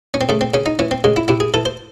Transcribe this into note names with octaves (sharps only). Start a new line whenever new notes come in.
C#4
C4
C#3 A3
C4
C#3 C#4
D#4
E3 C#4
C4
C#3 G#3
E4
C3 E4
G#4
E3 A4
C5